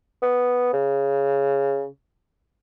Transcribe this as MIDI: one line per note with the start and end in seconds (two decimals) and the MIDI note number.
0.22 0.73 59
0.74 1.87 49